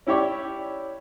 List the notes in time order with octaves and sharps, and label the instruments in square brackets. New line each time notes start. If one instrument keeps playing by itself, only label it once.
[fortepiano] C#4 E4 G4 C#5 D5